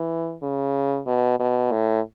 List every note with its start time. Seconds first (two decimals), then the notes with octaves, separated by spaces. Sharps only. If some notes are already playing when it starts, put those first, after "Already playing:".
Already playing: E3
0.43 C#3
1.07 B2
1.39 B2
1.72 A2